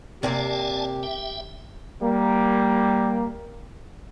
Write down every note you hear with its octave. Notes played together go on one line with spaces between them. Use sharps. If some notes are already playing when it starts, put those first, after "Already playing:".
C3 A#3 C4 G4 D5 G#5 A5
E5 G5
G3 A#3